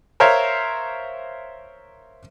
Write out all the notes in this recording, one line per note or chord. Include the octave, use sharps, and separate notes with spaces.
A#4 C5 C#5 E5 F5